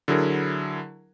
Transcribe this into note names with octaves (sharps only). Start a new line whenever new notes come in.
D3 F#3 E4 G#4 A#4